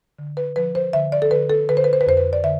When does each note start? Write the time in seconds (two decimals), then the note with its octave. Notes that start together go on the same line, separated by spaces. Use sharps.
0.19 D3
0.37 B4
0.56 F3 B4
0.75 C5
0.93 D3 E5
1.12 D5
1.22 A4
1.31 D3 B4
1.50 A4
1.69 D3 B4
1.77 C5
1.84 B4
1.93 C5
2.01 B4
2.07 F2 C5
2.17 B4
2.33 D5
2.44 D3 E5